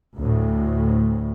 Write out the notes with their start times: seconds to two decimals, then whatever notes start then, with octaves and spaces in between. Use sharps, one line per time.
0.17 D2 A2